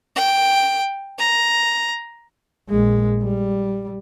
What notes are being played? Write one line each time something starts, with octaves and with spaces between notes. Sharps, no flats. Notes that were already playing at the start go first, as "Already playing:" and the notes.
G5
A#5
A#1 G#3
G3